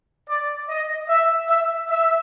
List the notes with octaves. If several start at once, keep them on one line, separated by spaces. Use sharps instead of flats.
D5
D#5
E5
E5
E5